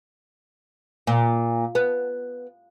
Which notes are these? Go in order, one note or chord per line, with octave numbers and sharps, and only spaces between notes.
A#2
B3